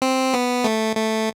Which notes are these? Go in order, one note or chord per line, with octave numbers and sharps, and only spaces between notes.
C4
B3
A3
A3